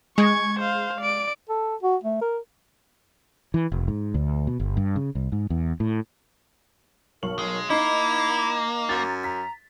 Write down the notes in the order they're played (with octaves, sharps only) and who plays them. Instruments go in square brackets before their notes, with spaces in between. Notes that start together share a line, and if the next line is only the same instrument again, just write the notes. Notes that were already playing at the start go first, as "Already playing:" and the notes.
[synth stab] G#3 [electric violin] C#6 G#6
[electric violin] C5 F5
D5 D7
[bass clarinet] A4
F#4
A3
A#4
[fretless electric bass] E3
F1
G#2
D2
B2
G1
G2
C#3
C2
G#2
E2
A2
[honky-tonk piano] B1 C#6 F#7 [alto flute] A#4
[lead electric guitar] G#3
[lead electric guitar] A#3 [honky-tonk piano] D#4 D#5 [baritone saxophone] E4 [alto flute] A#5
[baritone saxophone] F#2 [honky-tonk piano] A6
[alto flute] A#5 [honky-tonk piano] B6